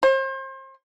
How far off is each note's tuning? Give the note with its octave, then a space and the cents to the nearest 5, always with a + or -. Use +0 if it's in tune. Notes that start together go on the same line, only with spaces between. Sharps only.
C5 +35